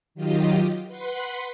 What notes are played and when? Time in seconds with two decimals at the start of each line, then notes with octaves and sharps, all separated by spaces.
0.15 D#3 F#3 F4 G4 D#5
0.87 B4 F#5 C6 B6